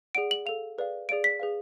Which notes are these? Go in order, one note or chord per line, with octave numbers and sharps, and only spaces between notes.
G#4 D5 F#5 D7
F#7
A4 F5 F7
G#4 B4 D5 F5
G#4 D5 F5 D7
B6
G#4 B4 F5